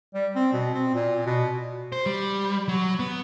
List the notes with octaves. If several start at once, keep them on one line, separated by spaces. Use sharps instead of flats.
G3
C4
B2
C4
A#2
B2
C5
G3
F#3
B3